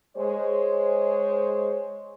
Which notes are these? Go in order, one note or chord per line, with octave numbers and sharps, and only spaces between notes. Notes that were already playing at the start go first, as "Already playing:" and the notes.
G#3 C5 C#5